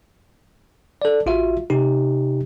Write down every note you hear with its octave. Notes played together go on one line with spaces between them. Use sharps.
A4 D5
A1 F4 F#4 E5
C3 D#4 G4